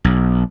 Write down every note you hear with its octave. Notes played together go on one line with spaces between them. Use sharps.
B1